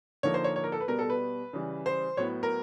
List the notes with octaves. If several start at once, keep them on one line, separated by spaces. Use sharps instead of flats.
D3 F3 A#3 D#4 C#5
C5
C#5
C#5
A#4
A4
B4
B2 G3 B3 A#4
A4
B4
C#3 E3 G3
C5
A2 F#3 B3 C#5
A#4